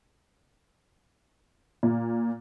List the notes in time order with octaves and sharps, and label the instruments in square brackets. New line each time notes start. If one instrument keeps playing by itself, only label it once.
[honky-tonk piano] A#2